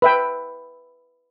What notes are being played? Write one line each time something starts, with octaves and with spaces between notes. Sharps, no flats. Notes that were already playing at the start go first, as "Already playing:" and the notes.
B4 E5 G5